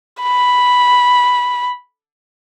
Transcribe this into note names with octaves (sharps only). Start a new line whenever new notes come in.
B5